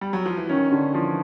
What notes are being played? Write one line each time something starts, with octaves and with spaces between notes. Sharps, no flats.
G3
F#3
F3
E3
D#3 C#4
D3
E3 F3